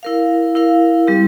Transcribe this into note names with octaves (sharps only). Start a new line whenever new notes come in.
E4 A#4 F5
E4 A#4 F5
G3 C4 G4